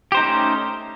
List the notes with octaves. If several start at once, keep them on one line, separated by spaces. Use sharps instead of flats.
A3 C#4 D#4 G4 C5